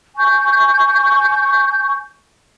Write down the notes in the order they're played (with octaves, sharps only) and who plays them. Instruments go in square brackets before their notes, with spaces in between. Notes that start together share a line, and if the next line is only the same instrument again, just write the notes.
[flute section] G#5 C#6 G6